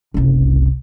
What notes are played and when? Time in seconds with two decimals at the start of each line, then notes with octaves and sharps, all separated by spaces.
0.14 F#1 C2